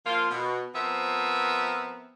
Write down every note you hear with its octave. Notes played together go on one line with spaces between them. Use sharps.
F3 A#3 F4
B2
F3 B3 C4 A#4 E5